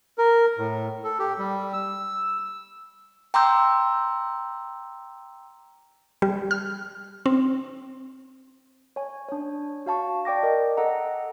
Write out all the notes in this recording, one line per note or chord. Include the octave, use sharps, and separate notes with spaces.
A#4
A2
A4
G4
G3
E6
G5 A#5 C6 D6 E6 G6
G3
F6
C4
C#5 G#5
D4 C#5
F#4 F5 A5 C#6
D5 G5 D6 A#6
A#4 D#5
A4 D#5 F#5 A#5